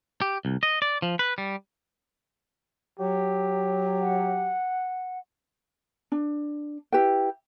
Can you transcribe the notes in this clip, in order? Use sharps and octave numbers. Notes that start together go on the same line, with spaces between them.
G4
C2
D#5
D5
F3
B4
G3
F#3 G4
F#5
D4
E4 G4 B4 G5